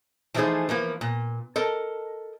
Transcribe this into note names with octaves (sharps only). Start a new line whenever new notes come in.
E3 F3 A3 D#4 G#4 C5
E3 F3 A#3
A#2
A4 A#4 D#5